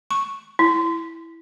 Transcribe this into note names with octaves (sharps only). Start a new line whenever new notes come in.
C#6
E4